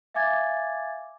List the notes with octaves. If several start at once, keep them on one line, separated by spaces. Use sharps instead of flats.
E5 F5 G#5 D6 G#6 A6